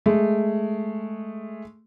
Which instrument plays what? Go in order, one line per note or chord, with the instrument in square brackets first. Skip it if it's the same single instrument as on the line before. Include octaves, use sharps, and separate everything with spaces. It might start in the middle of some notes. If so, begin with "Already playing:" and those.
[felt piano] G#3 A3